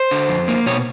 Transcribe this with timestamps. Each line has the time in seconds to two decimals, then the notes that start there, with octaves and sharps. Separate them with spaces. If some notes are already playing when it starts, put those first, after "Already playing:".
Already playing: C5
0.11 D3
0.29 F2
0.48 A#3
0.66 B2 C#5